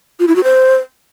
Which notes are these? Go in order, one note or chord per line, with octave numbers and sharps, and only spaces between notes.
F4
E4
F#4
C5